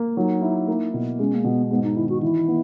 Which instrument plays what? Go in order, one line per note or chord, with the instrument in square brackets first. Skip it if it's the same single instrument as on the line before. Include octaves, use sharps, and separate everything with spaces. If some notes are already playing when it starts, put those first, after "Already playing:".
Already playing: [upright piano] A#3
[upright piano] F#3 [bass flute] D#4
[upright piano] E4
A#3
B2
[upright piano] G#3 [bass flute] C#4
[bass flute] A#3
[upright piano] B2 [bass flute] B3
[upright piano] G#2 [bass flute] B3
[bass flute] D#4
[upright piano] D#3 [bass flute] E4
[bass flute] F#4
[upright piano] E3 [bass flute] E4
[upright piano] B3